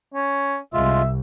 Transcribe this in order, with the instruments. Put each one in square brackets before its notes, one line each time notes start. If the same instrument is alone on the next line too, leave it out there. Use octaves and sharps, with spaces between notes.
[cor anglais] C#4
[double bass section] C2 [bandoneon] G#3 F4 [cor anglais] E5